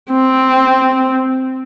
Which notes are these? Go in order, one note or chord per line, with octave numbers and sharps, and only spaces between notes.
C4